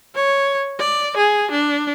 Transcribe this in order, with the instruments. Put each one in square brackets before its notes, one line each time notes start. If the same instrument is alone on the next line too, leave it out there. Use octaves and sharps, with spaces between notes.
[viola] C#5
D5
G#4
D4